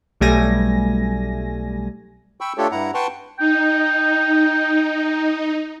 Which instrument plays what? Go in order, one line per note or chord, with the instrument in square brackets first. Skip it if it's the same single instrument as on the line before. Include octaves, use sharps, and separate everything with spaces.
[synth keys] B1 G3 A3 G#5 A#6
[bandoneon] G5 B5 C#6 E6
A3 D4 F4 G4 A4 C#5
G2 E4 F#5 A#5
B4 F#5 G5 A5 C6 C#6
[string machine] D#4 [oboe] G5